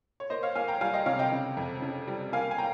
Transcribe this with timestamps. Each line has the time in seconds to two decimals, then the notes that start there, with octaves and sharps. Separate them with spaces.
0.20 C#5
0.30 A#3 C5 D#5
0.43 C#5 F5
0.55 A#3 F5 G#5
0.68 G5 A#5
0.81 G3 F5 G#5
0.94 D#5 G5
1.06 C3 C#5 F5
1.19 D#5 G5
1.32 C#3
1.57 F2
1.82 C#3
2.07 G3
2.33 A#3 F5 G#5
2.51 G#5
2.58 A#3 G5 A#5